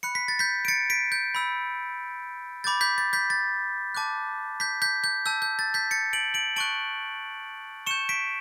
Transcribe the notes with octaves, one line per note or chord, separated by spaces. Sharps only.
B5 F#6 C#7
B6
A6
G6 B6
D7
A6 C#7
B6 D7
G6
B5 E6 G6
B5 D6 G6 A6
G6 B6
A6
G6 B6
A6
A5 D6 F#6
G6 B6
G6 B6
G6
A5 E6 G6
G6
A6
G6 B6
A6 C#7
D7 F#7
D7 F#7
A5 C#6 F#6 D7 F#7
C#6 G6 C#7 E7
B6 D7